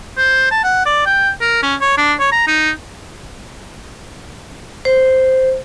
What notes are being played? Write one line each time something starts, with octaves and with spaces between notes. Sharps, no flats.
C5
A5
F#5
D5
G5
A#4
C#4
C#5
D4
C#5
A#5
D#4
C5